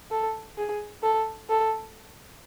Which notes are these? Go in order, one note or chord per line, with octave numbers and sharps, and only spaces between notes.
A4
G#4
A4
A4